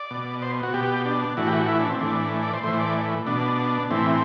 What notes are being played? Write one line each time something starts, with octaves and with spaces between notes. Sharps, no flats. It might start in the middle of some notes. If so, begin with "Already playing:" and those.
Already playing: D5
B2
C5
F#4
B2 G4
D4
A2 E3 F#4
G4
F#4
E4
D4
C4
A2 E3 D4
D5
C5
A2 E3 C5
D5
B2 D4
A2 E3 C4